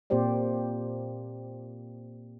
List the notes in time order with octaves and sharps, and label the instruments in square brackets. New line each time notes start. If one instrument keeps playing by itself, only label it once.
[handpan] A#2 A#3 C4 G4 C5 D5